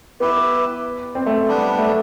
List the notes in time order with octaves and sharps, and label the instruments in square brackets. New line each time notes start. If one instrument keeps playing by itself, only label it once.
[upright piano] B3 [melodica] E4 G4 B4
[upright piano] C4
A3
[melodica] G3 B3 D4
[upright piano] A3